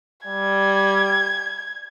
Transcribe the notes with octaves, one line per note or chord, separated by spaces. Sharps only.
G3 G#6